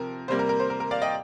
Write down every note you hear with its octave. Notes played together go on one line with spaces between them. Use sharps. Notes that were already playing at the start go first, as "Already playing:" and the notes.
Already playing: C3 F3 C4 A#4
C3 G3 A#3 C5
A#4
A#4
C5
A#4
A#4
D5 F5
D#5 G5